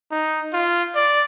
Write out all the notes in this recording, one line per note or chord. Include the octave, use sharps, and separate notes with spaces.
D#4
F4
D5